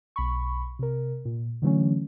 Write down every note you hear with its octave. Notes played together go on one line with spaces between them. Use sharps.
B1 B5 C#6
C3 A#4
A#2
D3 E3 F#3 A3 C#4